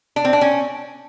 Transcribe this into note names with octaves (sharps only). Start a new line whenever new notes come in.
D4
C4
D4
C#4